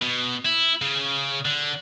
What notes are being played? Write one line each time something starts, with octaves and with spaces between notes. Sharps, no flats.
B2
E4
C#3
D3